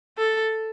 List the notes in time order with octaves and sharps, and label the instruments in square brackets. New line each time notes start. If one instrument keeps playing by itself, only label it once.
[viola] A4